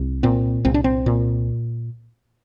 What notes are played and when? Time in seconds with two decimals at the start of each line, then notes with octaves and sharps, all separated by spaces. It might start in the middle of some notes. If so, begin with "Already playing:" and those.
Already playing: C2
0.23 A#2 C4
0.65 C2 C4
0.74 D4
0.84 C4
1.06 A#2